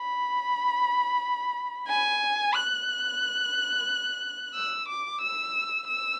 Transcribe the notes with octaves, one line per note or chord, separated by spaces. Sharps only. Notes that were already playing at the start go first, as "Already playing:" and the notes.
Already playing: B5
G#5
F#6
E6
D6
E6
E6